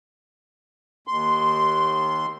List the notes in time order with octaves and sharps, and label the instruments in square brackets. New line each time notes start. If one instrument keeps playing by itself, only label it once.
[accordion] D#2 C6